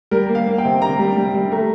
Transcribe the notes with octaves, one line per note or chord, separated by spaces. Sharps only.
G3 A#4
A#3
F5
A#3
G5
C3
C3 A#5
G3
G3
G3
A3 A#5